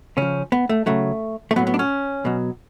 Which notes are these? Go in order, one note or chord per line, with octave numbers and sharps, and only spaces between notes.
C#3 F3 C#4
B3
A3
C#3 F#3 A3
A3
A2 F#3 B3
B3
D4
C#4
B2 F#3